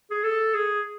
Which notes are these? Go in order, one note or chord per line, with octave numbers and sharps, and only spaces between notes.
G#4
A4
G#4